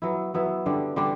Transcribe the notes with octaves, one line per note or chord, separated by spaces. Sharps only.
F#3 B3 E4
F#3 B3 E4
D3 G3 D4
D3 G3 D4